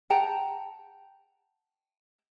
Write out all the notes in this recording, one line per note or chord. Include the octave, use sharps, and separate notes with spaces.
F#5 G5 A5 A#5